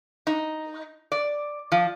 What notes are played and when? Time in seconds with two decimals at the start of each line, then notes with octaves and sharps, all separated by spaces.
0.27 D#4
1.12 D5
1.72 F3